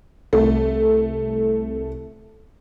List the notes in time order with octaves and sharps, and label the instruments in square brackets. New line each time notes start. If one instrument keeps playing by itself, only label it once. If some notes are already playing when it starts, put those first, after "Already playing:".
[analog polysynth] C2 [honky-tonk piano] A3